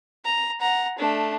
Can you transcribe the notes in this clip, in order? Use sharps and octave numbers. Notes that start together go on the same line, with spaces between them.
A#5
F#5 A#5
A3 D4